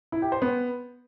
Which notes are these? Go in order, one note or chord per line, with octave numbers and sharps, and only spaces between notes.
E4
G4
C5
B3